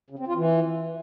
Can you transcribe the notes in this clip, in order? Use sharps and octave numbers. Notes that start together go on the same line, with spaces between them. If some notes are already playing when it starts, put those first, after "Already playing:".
C#3
C4
F4
E3